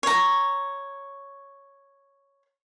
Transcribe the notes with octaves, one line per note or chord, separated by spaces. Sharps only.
C#5 A#5